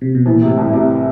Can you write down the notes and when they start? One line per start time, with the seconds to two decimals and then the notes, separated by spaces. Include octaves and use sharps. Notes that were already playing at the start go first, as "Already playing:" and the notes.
0.02 C3
0.15 B2
0.26 A#2 E3
0.42 C3
0.48 A2
0.57 C2
0.68 A2
0.73 C3